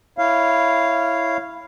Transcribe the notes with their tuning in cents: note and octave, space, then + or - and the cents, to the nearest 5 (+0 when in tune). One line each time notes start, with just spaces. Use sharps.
E4 +0 C#5 -5 F5 -10